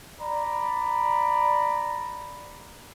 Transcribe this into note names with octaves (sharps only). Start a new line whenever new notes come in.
D5 A#5 B5